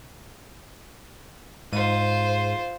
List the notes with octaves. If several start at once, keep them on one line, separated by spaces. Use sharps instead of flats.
G#2 F4 C5 D#7